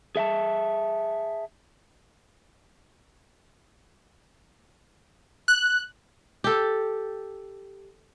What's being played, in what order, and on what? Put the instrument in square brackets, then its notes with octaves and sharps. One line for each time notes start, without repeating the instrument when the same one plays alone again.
[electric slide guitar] G#4 E5 G5 A5
[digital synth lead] F#6
[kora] G4 A4